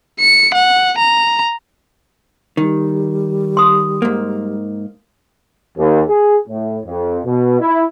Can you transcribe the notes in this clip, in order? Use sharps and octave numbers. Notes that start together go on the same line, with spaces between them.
C#7
F#5
A#5
D#3 G3
C6 D#6
G#2 A#3
D#2
G#4
A2
F2
B2
E4